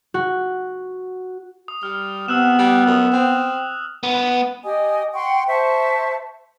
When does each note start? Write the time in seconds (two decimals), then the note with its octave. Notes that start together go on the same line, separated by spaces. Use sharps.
0.14 F#4
1.68 D#6
1.83 G3 F6
2.28 C3 B3 E6 F#6 E7
2.59 G3
2.86 F#2 D#6
3.13 C4
4.03 B3
4.63 G4 D#5 G#5 D#6
5.13 F#5 G5 C6 C#6
5.48 C5 E5 A5 C#6